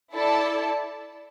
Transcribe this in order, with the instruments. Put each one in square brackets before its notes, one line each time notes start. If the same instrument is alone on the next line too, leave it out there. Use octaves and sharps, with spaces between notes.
[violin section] E4 A4 D5 A5